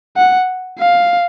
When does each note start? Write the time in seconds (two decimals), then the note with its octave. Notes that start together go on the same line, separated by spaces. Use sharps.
0.17 F#5
0.79 F5